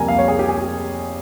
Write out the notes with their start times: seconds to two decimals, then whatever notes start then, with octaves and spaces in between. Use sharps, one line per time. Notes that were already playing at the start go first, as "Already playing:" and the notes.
Already playing: F2 C3 G3 A#3 G#5 A#5
0.08 F5
0.19 C#5
0.28 G#4
0.39 G4
0.49 G#4
0.59 G4